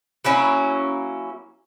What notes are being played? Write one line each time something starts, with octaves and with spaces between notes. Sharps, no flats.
F#3 A#3 C#4 E4